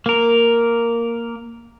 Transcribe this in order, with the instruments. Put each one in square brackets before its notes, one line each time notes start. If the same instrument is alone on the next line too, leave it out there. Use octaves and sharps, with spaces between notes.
[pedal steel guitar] A#3 A#4